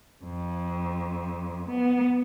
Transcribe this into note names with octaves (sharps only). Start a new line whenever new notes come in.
F2
B3